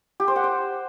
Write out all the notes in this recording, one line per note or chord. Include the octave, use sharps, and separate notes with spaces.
G4
C5
F#5
G5